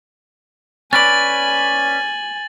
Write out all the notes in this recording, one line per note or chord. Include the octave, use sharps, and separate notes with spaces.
C#4 B4 D5 G#5 A6 F#7